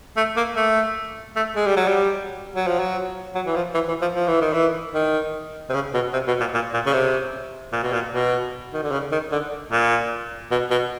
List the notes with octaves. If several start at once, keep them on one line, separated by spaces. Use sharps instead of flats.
A3
A#3
A3
A3
G#3
G3
F#3
G3
F#3
F3
F#3
F#3
E3
F3
E3
E3
F3
F3
E3
D#3
E3
D#3
C3
C#3
B2
C3
B2
A#2
A#2
A#2
C#3
C3
A#2
B2
A#2
B2
D#3
D3
C#3
D#3
D3
A#2
B2
B2